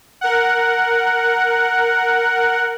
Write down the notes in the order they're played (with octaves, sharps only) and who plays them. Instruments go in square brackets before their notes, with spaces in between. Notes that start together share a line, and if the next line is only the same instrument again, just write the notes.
[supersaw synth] A#4 F#5